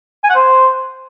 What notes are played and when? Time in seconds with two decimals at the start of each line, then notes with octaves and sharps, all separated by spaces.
0.24 G#5
0.29 F#5
0.35 C5